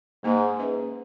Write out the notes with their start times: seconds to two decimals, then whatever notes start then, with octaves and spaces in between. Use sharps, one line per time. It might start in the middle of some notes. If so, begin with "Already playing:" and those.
0.24 G#2 A#3 D#4 G#4
0.59 C#4 G#4 B4 E5